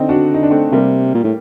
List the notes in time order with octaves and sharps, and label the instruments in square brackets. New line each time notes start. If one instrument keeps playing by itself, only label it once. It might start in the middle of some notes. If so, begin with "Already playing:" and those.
Already playing: [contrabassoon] D3 [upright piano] C4 D#4
[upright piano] D4 F#4
D#4
D4
A3 C4
[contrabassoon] C3 [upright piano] G3 A#3
[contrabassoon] A#2
A2